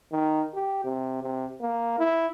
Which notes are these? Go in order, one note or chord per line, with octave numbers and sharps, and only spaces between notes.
D#3
G4
C3
C3
A#3
E4